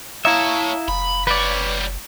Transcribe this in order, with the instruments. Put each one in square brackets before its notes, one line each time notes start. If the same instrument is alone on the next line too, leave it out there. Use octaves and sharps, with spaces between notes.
[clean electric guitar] E4 E5 [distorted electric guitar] C#5 A5 [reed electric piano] F5 A#5 D#6
[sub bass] F#1 [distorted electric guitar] B5
[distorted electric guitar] G3 C#5 [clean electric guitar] B4 D5